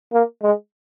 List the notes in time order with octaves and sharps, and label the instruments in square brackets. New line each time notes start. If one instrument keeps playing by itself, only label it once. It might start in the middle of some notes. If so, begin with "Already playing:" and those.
[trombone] A#3
G#3